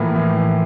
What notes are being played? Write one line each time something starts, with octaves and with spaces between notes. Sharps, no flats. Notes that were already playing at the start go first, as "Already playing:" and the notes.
Already playing: A2 E3 F3 A#3
A2
E3